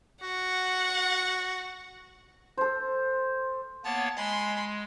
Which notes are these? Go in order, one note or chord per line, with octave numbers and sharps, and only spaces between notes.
F#4 F#5
A4 C5
A#3 B3 C#5 F#5 A5
G#3 G#5 B5 C6